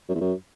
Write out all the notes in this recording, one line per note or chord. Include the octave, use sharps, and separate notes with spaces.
F#2
E2
F#2